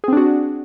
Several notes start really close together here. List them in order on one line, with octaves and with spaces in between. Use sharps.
G#4 C4 D4 F#4